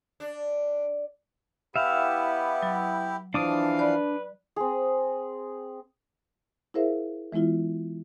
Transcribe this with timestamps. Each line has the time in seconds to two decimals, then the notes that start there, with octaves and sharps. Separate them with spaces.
0.20 D4
1.76 B3 E4 G4 E5 F5
2.62 F#3
3.34 E3 F3 D4 F5 D6 D#6
3.79 B4 D5
4.56 C4 G#4
6.74 E4 G#4 A#4 C5 E5 F5
7.32 E3 G#3 B3 E4 F4